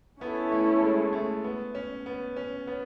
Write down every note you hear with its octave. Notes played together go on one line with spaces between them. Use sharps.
B3 C#4 E4 A4 C#5
A3
G#3
A3
B3
C#4
B3
C#4
B3